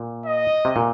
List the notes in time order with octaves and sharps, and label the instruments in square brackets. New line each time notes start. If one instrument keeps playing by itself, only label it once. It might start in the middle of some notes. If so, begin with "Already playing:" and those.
Already playing: [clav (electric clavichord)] A#2
[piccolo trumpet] D#5
[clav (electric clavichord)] C3
A#2